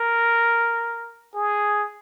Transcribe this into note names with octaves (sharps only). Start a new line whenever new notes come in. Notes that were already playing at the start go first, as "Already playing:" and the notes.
Already playing: A#4
G#4